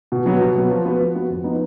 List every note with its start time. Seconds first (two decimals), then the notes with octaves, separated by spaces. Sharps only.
0.12 B2
0.26 F#3 B3
0.41 B2
0.55 F#3 B3
0.71 F3
0.85 B3 F#4 B4
1.00 F3
1.16 B3 F#4 B4
1.30 F2
1.44 F3 B3 D#4